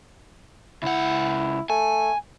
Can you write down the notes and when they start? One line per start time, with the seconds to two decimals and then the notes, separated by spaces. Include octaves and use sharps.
0.83 C#2 E4 F#5
1.70 A3 G#5